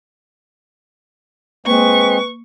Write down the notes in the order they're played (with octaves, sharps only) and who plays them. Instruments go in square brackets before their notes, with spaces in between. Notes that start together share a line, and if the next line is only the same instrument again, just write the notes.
[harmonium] G#3 C4 [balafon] A#3 [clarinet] B4 [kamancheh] C#6